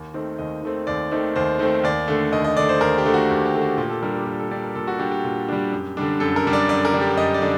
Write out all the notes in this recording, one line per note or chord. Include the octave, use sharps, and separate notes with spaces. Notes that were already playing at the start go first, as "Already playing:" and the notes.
Already playing: D#2
D#3 A3 C4
D#2 D#5
D#3 A3 C4
D#2 D5
D#3 A3 C4
D#2 C5
D#3 A3 C4
D#2 D5
D3 A3
D#2 D#5
D#5
D3 A3 D5
C5
D#2 A#4
G4
D3 A3
F#4
D#2 G4
G4
D3 A3
F#4
A#2 G4
A4
G3 D4 A#4
G4
A#2 G4
A4
G3 D4 D5
A#4
A#2 A4
F#4
G3 D4 G4
G4
A#2
G3 D4
F#2
D3 G3 D4
F#2 A4
A#4
D3 G3 D4
D5
F#2 D5
A#4
D3 G3 D4
G4
F#2 D#5
D5
D3 G3 D4